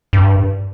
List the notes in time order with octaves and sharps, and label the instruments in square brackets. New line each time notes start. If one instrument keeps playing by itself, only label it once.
[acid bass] G2